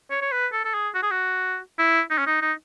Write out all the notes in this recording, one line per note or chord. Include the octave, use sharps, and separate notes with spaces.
C#5
C#5
B4
A4
A4
G#4
F#4
G#4
F#4
E4
D#4
C#4
D#4
D#4